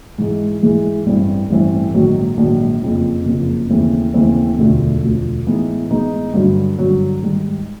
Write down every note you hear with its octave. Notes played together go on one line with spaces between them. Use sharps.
G#2 E3 G#3
G#2 E3 G#3
A1 G2 E3 A3 C4
A1 G2 E3 A3 C4
A#1 G#2 D#3 F#3
A#1 G#2 D#3 F#3
F#1 F2 C#3 F3 A#3
F#1 F2 C#3 F3 A#3
D#2 C#3 E3 A3 C4
D#2 C#3 E3 A3 C4
E1 D2 D3 F3 A3
E1 D2 D3 F3 A3
A2 E3 G#3 B3 D#4
A2 E3 G#3 B3 D#4
G2 D3 F#3
G2 D3 F#3
G#2 D#3 G3